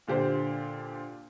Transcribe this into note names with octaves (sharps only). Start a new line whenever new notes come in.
A#2 D3 G4 C5